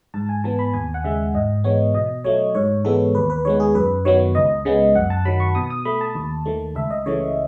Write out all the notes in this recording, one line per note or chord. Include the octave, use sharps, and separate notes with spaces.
G#2 A5
G#5
E3 B3 A5
B5
D#2 G#5
F#5
C#3 G#3 E5
G#2 D#5
E3 G#3 B3 C#5
B2 D#5
F#3 A3 C#5
G#2 C#5
E3 G#3 B3 A4
D#2 B4
B4
D#3 G#3 B3 C#5
G#4
F#2 B4
D#3 F#3 B3 C#5
C#2 D#5
C#3 G#3 B3
F#2 F#5
A5
D#3 F#3 B5
C#6
B2 D#6
D#6
A3 B5
A5
D#2
D#3 A3
C#2 E5
D#5
C#3 E3 A3 C#5